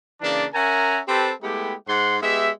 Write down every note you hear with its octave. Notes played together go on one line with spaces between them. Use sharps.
C#3 E3 A#3 D4
C#4 A#4 E5 F#5 G#5 A#5
C4 G4 A4 B4 C5 A5
G#3 A3 B3 E4 G4
G#2 F#5 C6
G#3 B3 G4 D#5 E5